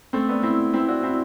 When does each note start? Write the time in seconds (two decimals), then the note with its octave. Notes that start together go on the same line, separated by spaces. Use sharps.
0.13 A3 C4
0.29 B3 D4
0.43 C4 E4
0.73 C4 E4
0.88 D4 F#4
1.03 C4 E4